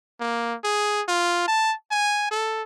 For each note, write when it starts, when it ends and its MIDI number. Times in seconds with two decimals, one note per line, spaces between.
0.20 0.55 58
0.64 1.02 68
1.08 1.43 65
1.48 1.74 81
1.91 2.26 80
2.31 2.63 69